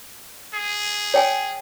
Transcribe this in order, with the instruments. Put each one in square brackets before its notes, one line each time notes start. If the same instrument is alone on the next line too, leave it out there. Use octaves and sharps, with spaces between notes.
[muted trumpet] G#4
[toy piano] C#5 G5 G#5